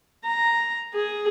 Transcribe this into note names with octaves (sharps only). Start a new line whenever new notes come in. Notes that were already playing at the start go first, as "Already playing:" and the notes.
A#5
G#4